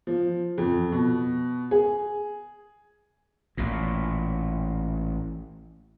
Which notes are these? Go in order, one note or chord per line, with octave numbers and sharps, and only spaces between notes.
F3
F2
B2
G#4
A1 A#2